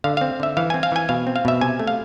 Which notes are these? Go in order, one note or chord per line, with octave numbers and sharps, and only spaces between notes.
D3 F5
C4 F5
D3 E5
E3 F5
C4 G#5
F5
E3 G#5
B2 F5
C4
F5
B2 E5
C3 G#5
A3
F5